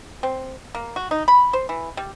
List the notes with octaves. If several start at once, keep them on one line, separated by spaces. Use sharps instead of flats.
C4
A#3
F#4
D#4
B5
C5
E3
G3